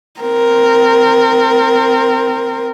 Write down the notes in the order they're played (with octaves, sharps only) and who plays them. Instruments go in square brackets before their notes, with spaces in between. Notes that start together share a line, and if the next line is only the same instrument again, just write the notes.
[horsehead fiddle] C4 A#4